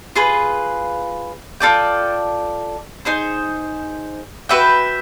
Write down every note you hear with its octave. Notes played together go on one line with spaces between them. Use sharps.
F4 G#4 B4
F4 A4 D5 G5
D#4 G#4 C5
F#4 B4 E5 G5